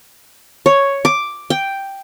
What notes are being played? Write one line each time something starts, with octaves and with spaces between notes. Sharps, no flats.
C#5
D6
G5